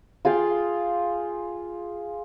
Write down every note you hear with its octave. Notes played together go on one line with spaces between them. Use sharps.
F4 G#4 F5 G5